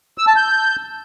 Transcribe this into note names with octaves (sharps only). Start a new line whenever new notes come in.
E6
A5
G6